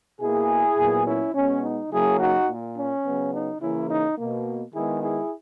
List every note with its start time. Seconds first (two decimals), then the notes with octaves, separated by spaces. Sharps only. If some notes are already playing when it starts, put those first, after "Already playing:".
0.21 B2 A#3 E4 G#4
0.78 A#2 F#3 B3
1.06 C#4 E4
1.35 B2 G#3 B3 C#4
1.63 D#4
1.91 C#3 F#3 A#3 E4 G#4
2.20 D#4 F#4
2.48 A#2 A#3
2.76 C#4
3.05 C#3 F#3 B3
3.33 D#4
3.61 C#3 E3 A#3 C#4 E4
3.90 D#4
4.18 B2 A#3
4.75 D#3 G#3 B3 E4 G#4
5.03 E4 G#4